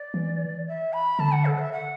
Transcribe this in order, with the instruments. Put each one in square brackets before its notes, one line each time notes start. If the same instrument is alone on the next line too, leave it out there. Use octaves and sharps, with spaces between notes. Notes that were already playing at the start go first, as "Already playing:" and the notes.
Already playing: [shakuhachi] D5
[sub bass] E3
[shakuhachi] E5
B5
[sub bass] D3 [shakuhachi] A5
[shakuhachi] F#5
A4
E5
F#5